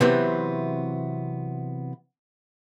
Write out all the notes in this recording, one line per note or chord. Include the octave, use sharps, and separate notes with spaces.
C3 E3 F#3 B3 C4